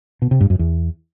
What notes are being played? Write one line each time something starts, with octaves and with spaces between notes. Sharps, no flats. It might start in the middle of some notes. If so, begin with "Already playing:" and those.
B2
C3
G2
F#2
E2